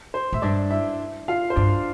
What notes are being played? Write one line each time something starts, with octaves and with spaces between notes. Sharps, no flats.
C5
A2 E5
G2 D4 D5
E4 E5
F4 F5
C5
G2 D4 D5